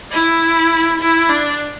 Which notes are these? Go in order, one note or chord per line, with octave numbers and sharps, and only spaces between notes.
E4
E4
D4